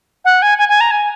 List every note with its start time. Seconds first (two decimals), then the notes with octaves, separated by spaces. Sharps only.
0.25 F#5
0.42 G#5
0.58 G#5
0.69 G#5
0.81 A#5
0.91 G#5